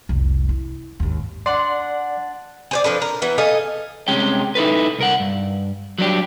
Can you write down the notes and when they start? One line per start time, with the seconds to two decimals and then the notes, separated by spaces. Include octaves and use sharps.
0.09 F1 C2
0.49 E4
1.00 G#1 D#2
1.46 D4 D5 F#5 C6
2.71 G#4 C5 D5
2.84 F3 D4 A4 B4
3.02 A#4
3.22 E3 B3
3.38 A4 D#5 F5 G#5
4.08 C2 C3 G#3 C#4 G5
4.55 D#4 E4 A4 B4
4.99 C2 A#4 F#5
5.20 G2
5.98 F#3 G3 D4 G4